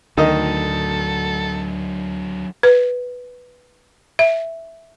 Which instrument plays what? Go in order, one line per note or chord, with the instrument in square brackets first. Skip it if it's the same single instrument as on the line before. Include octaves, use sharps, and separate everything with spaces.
[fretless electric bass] D2 [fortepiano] D#3 D#5 [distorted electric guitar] F#3 D4 [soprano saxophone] A4
[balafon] B4
E5